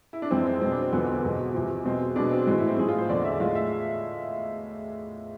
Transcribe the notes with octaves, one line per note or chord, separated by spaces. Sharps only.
E4
D4
F2 E3 G#3 C4
C4
B2 G#3 C4
D4
C4
E2 D3 F3 G#3 B3
B3
C4
E2 B2 G#3
E2 C3 F3
B2 G#3 C4
B2 G#3 D4
C4
A2 E3 G#3
E4
C4
A2 F3 G#3 G#4
F4
C5
E2 D3 G#3 D5
E5
A2 F3 G#3 F5
E5